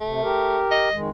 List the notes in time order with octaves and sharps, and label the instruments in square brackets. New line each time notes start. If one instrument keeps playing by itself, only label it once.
[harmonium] C3 [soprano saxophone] A3
[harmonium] G4 A#4
[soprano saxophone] D#5
[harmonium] F2 D#3 G#3